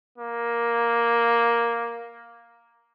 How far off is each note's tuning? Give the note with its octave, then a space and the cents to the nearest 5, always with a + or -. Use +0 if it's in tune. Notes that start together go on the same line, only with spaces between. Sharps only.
A#3 +5